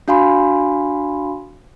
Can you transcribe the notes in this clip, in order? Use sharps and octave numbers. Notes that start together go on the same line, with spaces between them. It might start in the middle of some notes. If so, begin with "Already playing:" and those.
D4 F#4 F5 G#5 B5 C6